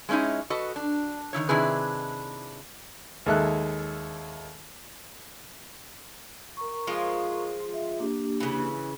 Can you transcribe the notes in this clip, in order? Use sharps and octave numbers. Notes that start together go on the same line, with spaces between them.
G#3 A3 C#4 D#4 E4
F#4 A4 B4 D#5
D4
D3 D#3 E4 C#5
C3 D#3 D4 E4 G#4 B4
D#2 G#3 A4 E5 F#6
A#4 A#5 C#6
F3 G#3 F4
E5
A#3 D4 G4
C#3 E3